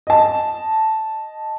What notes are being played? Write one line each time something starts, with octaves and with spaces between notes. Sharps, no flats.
D#5 A5